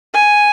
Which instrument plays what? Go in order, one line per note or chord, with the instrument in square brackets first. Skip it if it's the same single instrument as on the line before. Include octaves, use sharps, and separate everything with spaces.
[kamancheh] G#5